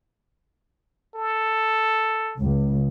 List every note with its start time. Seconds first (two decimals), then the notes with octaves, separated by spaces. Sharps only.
1.15 A4
2.39 C#2